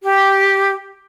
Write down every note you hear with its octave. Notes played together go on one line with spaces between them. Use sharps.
G4